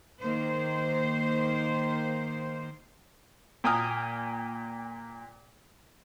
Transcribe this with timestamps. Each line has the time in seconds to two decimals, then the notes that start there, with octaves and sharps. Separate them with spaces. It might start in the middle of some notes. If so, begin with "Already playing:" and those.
0.21 D#3 A#3 C5
3.64 A#2 G5 G#5 A#5 D#6 F6